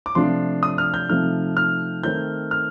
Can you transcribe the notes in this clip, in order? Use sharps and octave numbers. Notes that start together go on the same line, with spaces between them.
D6
C3 F3 A3 D4 F4 C6
D#6
F6
G6
C3 F3 A3 D#4 F6
F6
D#3 A3 C4 D#4 G6
F6